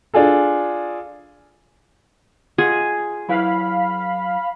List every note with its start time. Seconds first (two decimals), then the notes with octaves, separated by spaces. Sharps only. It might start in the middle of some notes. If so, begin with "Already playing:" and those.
0.14 D4 F4 G#4 A4
2.58 F4 G#4 D#5 F#5
3.29 F#3 E4 B4 F5 B5